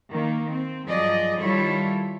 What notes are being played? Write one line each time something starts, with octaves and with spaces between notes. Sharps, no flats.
D#3 A#3
C4
G2 F3 F#3 G#4 D5 D#5
D#3 G3 E4 F4 A4 C#5